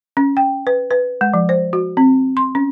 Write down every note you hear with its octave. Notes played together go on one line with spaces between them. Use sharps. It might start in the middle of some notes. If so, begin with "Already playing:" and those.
C#4
G5
B4
B4
G#3
F3
C5
F#4
C4
C6
C#4